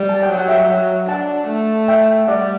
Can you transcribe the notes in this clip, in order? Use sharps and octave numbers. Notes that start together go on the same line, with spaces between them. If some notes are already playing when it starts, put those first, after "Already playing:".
Already playing: G3
A5
G5
F#3
F#5
E5 G5
F#3
D4 F#5 A5
A3
E5 G5
G3 D5 F#5